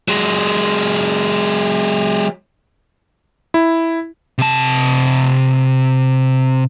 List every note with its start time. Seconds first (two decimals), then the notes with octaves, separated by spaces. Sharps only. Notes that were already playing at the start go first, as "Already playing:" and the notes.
0.08 F#3 G#3
3.54 E4
4.38 C3 A5